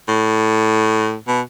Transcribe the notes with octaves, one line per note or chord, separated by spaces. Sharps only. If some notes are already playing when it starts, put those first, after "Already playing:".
A2
B2